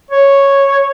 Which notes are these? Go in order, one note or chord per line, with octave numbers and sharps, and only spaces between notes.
C#5